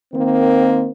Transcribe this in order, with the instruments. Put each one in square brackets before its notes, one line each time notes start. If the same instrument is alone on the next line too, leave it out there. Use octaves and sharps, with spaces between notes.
[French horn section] D#3 A#3 C4